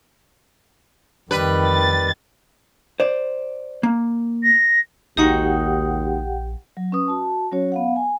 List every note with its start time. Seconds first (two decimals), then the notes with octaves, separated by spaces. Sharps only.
1.31 F2 D#3 G3 B4
1.67 A6
3.00 C5 D5
3.83 A#3
4.43 A#6
5.17 A#1 D#2 G#3 D#4 F#4 G4 F#5 G5
6.77 F#3
6.92 C#4 B4 D#6
7.08 F#4 A5
7.52 F#3 C#4 F#4 C#5
7.72 B3 F5 F#5
7.96 G#5